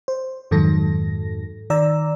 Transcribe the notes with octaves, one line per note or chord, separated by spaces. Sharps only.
C5
F2 G#2 D#3 F#3 A4 A#6
D#3 D5 A#5 E6